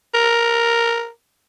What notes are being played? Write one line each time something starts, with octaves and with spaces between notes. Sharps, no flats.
A#4